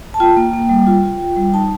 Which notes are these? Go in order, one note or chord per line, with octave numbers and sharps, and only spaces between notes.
A5
F4 G5
A#3
A#3
G3
F4
F4
F4
G3
D#4 A5